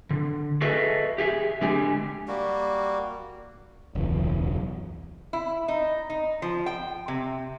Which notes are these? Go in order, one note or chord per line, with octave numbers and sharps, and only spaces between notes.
D3
F#4 G#4 A4 B4 D#5 E5
G4 G#4 E5
D3 G#3 G4 G#5
G3 A#3 F#4
E1 C#2 F#2 E3
E4
D#4
D#4
F3
G5
C3